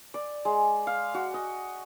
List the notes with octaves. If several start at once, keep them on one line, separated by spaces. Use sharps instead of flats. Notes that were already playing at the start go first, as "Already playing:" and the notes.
D5
G#3
F5
F#4
D#5